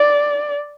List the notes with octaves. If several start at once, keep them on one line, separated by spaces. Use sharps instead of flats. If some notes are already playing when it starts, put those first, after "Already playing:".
Already playing: D5